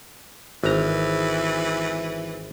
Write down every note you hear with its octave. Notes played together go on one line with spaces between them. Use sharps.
G#1 E3 A#5